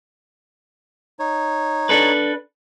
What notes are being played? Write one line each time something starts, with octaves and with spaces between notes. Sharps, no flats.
D#4 C#5
D4 A4 B4